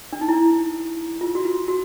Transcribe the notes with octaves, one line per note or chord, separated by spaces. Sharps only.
D4
D#4
E4
F4
F#4
F4
F#4